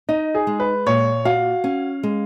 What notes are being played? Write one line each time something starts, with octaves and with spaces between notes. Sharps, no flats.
D#4 D#5
G#4
G#3
B4
A#2 C#5
F#4 F5
C#4
G#3